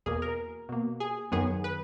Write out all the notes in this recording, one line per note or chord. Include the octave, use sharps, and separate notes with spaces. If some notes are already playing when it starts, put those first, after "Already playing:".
E2 B2 A#3 G#4
A#4
B2 A#3
G#4
F#2 D#3 F#3 B3 G#4
B4